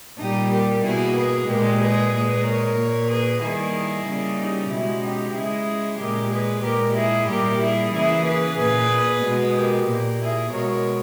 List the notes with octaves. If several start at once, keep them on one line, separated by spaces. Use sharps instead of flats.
A#2 G3 A#3 D#4 G4
G4 A#4
B2 A#3 E4 G#4
G#4 B4
A#2 G#3 G4 A#4
G#4 B4
A#2 G#3 G#4 B4
A#4 C#5
A#2 A#3
G#4 B4
D#3 G3 A#3 E4 G#4
C#3 G3 A#3
D#4 G4
B2 G#3 C#4 E4
D#4 G4
C#3 G#3 E4 G#4
A#2 G#3 G4 A#4
G#4 B4
A#2 G#3 G4 A#4
E4 G#4
A#2 G3 A#3 G4 A#4
E4 G#4
C#3 E3 A#3 E4 G#4
G#4 B4
A#2 A#3 G#4 B4
B2 G#3
G4 A#4
A#2 A#3
E4 G#4
B2 G#3 A#4 C#5